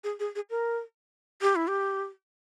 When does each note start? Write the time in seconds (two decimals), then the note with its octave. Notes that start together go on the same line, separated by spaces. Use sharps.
0.04 G#4
0.20 G#4
0.35 G#4
0.50 A#4
1.42 G4
1.56 E4
1.69 G4